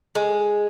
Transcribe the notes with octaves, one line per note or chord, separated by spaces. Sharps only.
G#3